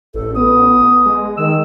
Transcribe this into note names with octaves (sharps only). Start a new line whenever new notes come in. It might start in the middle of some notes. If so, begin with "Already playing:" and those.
A1 A4
B3 D#6
G#3
D#3 E6